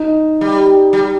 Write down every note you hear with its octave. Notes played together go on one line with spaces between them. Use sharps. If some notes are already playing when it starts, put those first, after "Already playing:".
Already playing: D#4
G3
G3